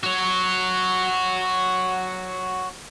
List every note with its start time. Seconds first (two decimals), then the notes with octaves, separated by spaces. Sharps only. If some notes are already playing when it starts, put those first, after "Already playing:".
0.03 F#4 C#5